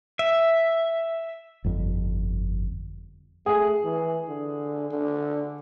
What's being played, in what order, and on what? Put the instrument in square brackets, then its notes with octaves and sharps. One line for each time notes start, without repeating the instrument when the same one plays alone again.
[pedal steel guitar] E5
[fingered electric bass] G1 F2
[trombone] A3 [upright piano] G#4
[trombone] E3
D3
D3